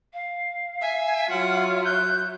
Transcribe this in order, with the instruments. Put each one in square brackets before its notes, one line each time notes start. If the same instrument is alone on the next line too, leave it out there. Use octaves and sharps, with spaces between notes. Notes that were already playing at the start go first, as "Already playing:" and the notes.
[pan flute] F5
[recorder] E5 [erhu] G#5
[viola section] F#3 C#5 E5 [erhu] F4 [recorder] F#5
[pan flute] F#6 [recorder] G6